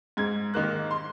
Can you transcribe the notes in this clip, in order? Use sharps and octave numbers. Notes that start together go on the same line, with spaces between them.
G#2 G#6
D#3 A#3 F#6
C6